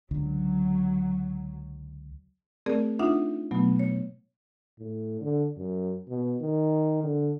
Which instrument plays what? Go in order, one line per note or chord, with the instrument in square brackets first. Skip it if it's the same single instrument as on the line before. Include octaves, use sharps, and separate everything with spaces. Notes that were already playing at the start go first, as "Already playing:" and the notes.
[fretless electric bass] C#2 D3 [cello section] F#3
[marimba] A3 C4 G#4 A#4 D5
D4 D#4 F4 E5 F#5
B2 F#3 A3 B3
C#5
[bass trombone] A2
D3
F#2
B2
D#3
D3